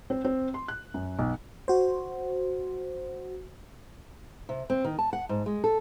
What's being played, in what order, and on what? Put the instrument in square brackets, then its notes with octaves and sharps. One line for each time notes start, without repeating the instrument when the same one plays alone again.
[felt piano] C4
C4
C6
F#6
F#2
B1
[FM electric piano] F#4 C5
[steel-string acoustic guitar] C3
C4
D#3
A5
F#5
G#2
G#3
A4